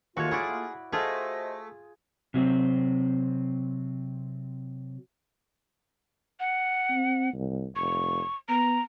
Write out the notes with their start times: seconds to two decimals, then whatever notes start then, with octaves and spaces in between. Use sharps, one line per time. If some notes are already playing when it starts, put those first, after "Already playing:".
0.17 D#2 A3 A#3 F4 F#4 C#5
0.31 E4 F#4 G#4 D5
0.93 A3 F4 F#4 G#4 C5 D#5
2.34 C3 F#3 C4
6.40 F#5
6.90 C4
7.33 C2
7.76 F1 C#6
8.49 B3 A#5